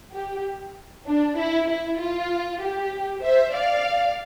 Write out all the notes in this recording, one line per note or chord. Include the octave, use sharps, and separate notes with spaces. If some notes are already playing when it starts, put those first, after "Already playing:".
G4
D4
E4
E4
F4
G4
C5 E5
D5 F5